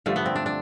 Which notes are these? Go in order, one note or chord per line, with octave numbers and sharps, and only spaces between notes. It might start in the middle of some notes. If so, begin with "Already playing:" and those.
G2 D3 F3 A3
B3
C4
D4
D4